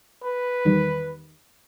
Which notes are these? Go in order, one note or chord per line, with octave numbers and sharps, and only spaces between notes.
B4
E2 D#3 G3